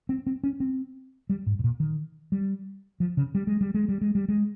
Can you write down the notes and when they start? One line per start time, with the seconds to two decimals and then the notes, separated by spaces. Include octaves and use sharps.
0.09 C4
0.27 C4
0.44 C#4
0.60 C4
1.29 G3
1.46 G#2
1.59 G#2
1.64 A#2
1.80 D#3
2.32 G3
3.00 F3
3.17 C#3
3.35 G3
3.47 G#3
3.61 G3
3.74 G#3
3.89 G3
4.01 G#3
4.15 G3
4.29 G#3